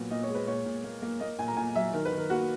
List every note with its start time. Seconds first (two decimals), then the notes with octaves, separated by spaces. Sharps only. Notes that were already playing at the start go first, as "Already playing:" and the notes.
Already playing: A#2 F#3 B3
0.10 A#2 D#5
0.23 C#5
0.28 G#3
0.35 B4
0.47 A#2 C#5
0.65 A#2
0.84 A#3
1.02 A#3
1.20 A#3 D#5
1.39 A#2 G#5
1.48 A#5
1.57 A#2 G#5
1.75 F#3 E5
1.93 D#3 A#4
2.05 B4
2.12 D#3
2.17 A#4
2.30 A#3 F#4